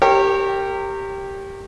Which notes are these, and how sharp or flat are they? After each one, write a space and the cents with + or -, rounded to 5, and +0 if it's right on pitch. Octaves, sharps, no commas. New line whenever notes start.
G4 +0 A#4 -30 C#5 -30